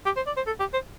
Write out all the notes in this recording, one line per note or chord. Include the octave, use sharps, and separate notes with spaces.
G4
C5
D5
C5
A4
G4
C5